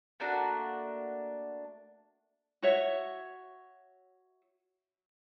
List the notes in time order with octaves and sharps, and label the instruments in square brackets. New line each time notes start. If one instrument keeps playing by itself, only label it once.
[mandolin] A3 A#3 D4 F#4
[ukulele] F#4 C#5 E5